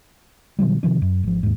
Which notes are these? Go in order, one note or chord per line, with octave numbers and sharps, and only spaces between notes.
B2 D#3 F#3 G3
C3 D#3 F3 D4
F#2
G#1 F3
D#2 G#2